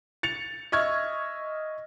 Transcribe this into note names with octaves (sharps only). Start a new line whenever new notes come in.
A6 C#7 F7
D#5 E5 C#6 F6 G#6